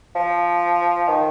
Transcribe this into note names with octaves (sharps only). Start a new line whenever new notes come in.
F3
D#3